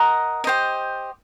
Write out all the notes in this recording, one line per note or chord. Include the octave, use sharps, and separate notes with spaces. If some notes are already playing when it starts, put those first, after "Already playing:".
Already playing: A#4 D#5 F#5 A#5
G4 C5 D#5